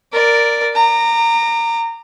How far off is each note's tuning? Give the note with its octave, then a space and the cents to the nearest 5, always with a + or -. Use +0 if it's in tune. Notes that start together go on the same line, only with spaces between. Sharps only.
A#4 +0 D5 -5
A#5 -15 D6 +30